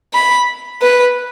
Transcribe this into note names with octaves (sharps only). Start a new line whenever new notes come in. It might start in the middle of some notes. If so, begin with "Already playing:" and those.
B5
B4